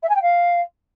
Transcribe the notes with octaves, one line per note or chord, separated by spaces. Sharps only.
E5
G#5
G5
F5